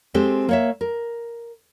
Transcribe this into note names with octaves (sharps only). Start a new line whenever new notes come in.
G#3 C4 G4 A4
A#3 C#5 E5
A#4